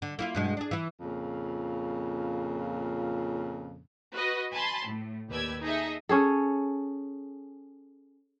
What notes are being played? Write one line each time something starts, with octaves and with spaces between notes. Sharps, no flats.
D3
A#3 E4 F4
G2 B2 G#3
D4 G#4
E3 E4
F2 A#2 C#3
F#4 B4 D#5
G#5 A5 B5 C6
A2
D#2 G4 B4 D5 E6 G#6
D#4 G#4 A4 D#5 E5
C#4 G#4 A4